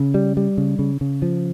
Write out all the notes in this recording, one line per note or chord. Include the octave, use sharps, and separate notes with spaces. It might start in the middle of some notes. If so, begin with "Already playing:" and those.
Already playing: C#3
G3
G3
C#3
C#3
C#3
F3